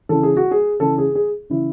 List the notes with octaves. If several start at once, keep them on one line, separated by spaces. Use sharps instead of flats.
C#3 E3 A4
G#4
F#4
G#4
C#3 E3 A4
G#4
G#4
C#3 E3 E4